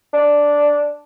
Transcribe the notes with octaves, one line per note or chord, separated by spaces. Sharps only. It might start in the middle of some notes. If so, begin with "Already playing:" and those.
D4